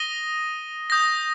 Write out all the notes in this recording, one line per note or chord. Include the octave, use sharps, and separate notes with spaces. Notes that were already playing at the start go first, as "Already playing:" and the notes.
Already playing: D#6 A#6 D#7 G7
D#6 G6 A#6